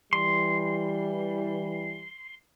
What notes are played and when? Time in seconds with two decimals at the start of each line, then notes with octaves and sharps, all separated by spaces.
0.13 E3 G3 C6